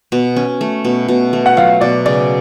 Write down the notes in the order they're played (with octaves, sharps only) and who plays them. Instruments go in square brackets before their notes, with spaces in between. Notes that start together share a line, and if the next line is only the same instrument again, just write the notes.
[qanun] B2
C#4
A3
B2
B2
A3
[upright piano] F#5
[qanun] F#3 [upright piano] F4 F5
[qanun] B2 [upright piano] D5
[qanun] C#3 [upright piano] D5